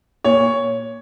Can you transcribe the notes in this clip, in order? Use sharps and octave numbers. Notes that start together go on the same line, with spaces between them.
A#2 C#5